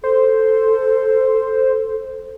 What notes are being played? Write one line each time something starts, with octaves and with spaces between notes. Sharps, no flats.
A4 C5